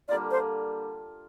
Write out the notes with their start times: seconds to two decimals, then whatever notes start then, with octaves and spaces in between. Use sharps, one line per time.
0.08 D3 G3 A#3 F4 D5
0.31 C5